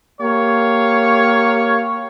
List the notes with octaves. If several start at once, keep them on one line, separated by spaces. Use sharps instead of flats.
A#3 G4 C#5 F5